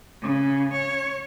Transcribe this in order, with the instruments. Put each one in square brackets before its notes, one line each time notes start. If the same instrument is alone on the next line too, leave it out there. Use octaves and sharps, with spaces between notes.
[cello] C#3
C#5